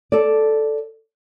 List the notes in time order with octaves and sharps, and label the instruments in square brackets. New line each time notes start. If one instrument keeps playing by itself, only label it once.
[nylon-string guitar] A4 D5